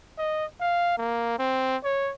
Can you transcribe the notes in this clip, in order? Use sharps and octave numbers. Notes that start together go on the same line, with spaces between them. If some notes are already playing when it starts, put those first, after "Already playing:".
D#5
F5
A#3
C4
C#5